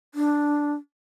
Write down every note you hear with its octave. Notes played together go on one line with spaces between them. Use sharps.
D4